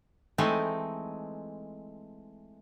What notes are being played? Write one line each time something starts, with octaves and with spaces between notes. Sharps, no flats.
E3 G#3 A3 C4 D#4